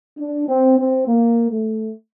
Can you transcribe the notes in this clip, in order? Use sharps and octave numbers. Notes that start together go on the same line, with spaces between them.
D4
C4
C4
A#3
A3